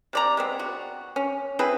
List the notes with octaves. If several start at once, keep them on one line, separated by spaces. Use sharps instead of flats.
C3 D5 A#5
G#3 B3 C4
F#4
C#4
C4 E4 G#4 B4